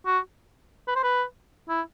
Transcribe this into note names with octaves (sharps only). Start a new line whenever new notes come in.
F#4
B4
C5
B4
E4